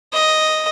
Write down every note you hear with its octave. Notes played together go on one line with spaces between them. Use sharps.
D#5